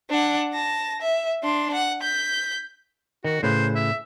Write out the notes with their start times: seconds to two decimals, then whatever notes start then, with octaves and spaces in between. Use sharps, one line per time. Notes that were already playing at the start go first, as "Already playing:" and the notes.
0.10 D4 F#5
0.54 A5 A#6
1.01 E5
1.43 D4 C6
1.74 F#5
2.03 G6 B6
3.25 D#3 F#4
3.43 A2 C#3 B4 C5
3.75 E5